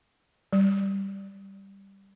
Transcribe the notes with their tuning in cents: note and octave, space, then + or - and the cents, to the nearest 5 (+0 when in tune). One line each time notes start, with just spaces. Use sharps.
G3 +0